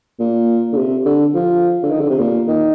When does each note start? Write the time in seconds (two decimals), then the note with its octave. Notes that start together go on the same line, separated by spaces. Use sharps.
0.20 A#2
0.73 D3
0.76 C3
1.05 D3
1.34 F3
1.83 D3
1.91 D#3
2.01 D3
2.10 C3
2.19 A#2
2.48 D#3